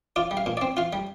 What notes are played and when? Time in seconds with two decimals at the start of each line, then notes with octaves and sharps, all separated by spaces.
0.16 F4 D5
0.31 G3
0.37 F5
0.46 A#2
0.57 C4 D5
0.77 F4 F5
0.93 G3